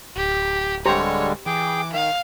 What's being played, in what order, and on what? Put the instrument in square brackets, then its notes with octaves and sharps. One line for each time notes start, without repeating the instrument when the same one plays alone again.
[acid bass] D1 [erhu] G4
[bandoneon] D3 G3 G#3 [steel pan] G4 C5 A#5 [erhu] C#5
[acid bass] E3 [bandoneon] G#4 G5 [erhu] D6
[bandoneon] D#3 [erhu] F5